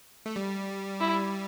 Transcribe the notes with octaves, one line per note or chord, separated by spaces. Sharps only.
A3
G3
E4